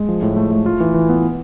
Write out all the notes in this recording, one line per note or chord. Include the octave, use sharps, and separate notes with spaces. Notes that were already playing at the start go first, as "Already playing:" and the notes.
Already playing: G#3
F3
A2
A3
A3
F4
E3
E3
B3